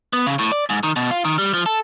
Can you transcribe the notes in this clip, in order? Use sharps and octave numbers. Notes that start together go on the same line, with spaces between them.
B3
C#3
A2
D5
G#2
D#3
B2
F4
D#3
G3
F3
A4